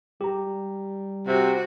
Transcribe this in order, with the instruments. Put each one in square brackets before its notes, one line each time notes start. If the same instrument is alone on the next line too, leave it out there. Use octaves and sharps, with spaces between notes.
[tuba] G3 [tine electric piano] G4 A#5
[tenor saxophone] C3 [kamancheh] F#4